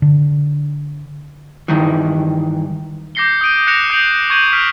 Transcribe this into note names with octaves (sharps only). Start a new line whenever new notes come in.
D3
G2 D#3 E3
D6 G6 A#6 C7 C#7 G7
D#6 G6 D7 D#7
F#6 A#6 C#7 E7 F7
D#6 G6 C7 D7 F7 F#7
C#6 G6 G#6 C#7 D#7 F#7
F6 B6 D7 F7